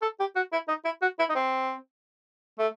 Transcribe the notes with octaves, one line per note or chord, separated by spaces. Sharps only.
A4
G4
F#4
E4
D#4
E4
F#4
E4
D#4
C4
A3